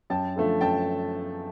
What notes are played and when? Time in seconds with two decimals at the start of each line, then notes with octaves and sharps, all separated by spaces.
0.10 F#2 G5 A5
0.36 D3 F3 A3
0.61 F#2 G5 A5